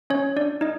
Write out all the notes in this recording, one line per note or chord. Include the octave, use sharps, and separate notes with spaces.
C#4 C#5
D4 D5
D#4 D#5